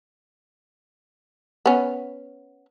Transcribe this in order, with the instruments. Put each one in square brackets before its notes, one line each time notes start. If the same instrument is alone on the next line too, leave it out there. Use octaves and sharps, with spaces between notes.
[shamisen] B3 C#4